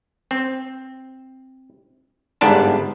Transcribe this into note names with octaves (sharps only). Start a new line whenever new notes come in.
C4
G1 G#2 B3 D4 A5